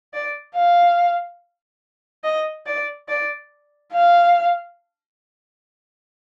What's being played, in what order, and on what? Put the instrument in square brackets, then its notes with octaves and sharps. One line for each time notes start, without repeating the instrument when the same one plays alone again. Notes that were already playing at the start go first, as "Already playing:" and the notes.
[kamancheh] D5
F5
D#5
D5
D5
F5